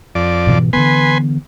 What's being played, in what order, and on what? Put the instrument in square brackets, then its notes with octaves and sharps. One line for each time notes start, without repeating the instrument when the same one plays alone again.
[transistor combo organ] F2 D5
[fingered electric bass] G#2 B2 E3
[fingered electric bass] D3 E3 B3 [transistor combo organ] B4 G#5 C6